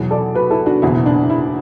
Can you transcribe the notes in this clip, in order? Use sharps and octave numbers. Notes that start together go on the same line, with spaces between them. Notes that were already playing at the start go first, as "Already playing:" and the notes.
Already playing: E2 B2 F#3
A4 D5
F#4 B4
E4 A4
D4 F#4
F#1 E2 B2 E4
D4
E4